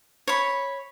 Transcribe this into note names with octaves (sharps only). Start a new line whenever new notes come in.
C#5 B5